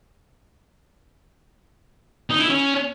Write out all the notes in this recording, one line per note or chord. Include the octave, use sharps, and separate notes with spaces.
D#4
E4
C#4